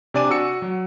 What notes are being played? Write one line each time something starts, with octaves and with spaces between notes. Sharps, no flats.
C3 D4 D5 G#5 D#7
F#4 E6 C#7
F#3